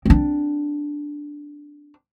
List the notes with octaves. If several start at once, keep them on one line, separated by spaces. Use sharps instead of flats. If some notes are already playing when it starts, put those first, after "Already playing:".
C4 D4